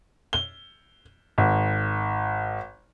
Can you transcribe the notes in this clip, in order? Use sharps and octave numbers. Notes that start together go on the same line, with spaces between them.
G7
G#1